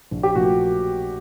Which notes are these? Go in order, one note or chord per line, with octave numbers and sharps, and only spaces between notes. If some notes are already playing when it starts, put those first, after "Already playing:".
A#1
G4
A#2 F3 A3 F#4